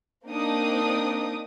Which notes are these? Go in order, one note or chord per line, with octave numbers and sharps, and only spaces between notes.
A#3 C4 D4 D#4 D6 D#6